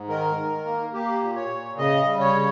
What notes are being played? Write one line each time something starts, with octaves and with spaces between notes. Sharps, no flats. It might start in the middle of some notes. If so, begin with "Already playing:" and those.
Already playing: G#2
D#3 A#4
D#3
A#3
A#3 G4
A#2
C#5
A#2
C#3 D#5
G3
C#5
C#3